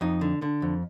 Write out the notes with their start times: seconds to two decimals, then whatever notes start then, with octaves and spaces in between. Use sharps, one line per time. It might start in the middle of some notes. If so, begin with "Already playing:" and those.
0.01 F2 D#4
0.21 D3
0.42 D3
0.62 F2